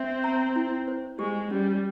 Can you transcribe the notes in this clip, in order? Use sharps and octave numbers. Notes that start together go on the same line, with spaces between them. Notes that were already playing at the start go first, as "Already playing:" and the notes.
Already playing: C4 E5
A#5
E4
C5
G#3 G4
G3 C#4